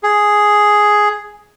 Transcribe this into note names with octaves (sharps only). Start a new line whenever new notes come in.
G#4